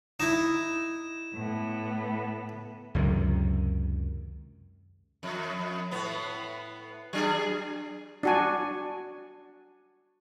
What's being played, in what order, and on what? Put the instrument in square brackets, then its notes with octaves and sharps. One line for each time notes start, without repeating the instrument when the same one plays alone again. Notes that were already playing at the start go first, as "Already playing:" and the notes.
[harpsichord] D#4 E4 [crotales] E7
[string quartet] A2 B3
[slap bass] C#2 F#2 C3 D#3
[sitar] F2
A2 B3
F#3 D4 G#4
[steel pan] D4 F#4 G#5